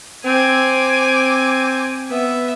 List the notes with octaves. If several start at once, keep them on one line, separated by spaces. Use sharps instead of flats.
C4 G#5 D6
B3 E5